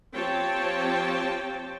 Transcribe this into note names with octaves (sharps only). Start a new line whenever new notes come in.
F3 C4 G4 C#5 G5 A5